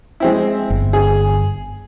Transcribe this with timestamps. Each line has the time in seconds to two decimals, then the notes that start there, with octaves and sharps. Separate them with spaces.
0.20 G#3 C4 E4
0.70 G1
0.93 G#4